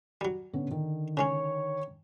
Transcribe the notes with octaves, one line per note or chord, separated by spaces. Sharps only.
F#3 G3
D3 B3 C#4
D3 D#3
C#3 G#3 C#4 C#5